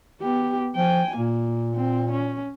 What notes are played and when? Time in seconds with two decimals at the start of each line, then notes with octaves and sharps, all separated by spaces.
0.20 B3 G4
0.76 F3 G5 G#5
1.17 A#2 A#3
1.75 C4
2.12 C#4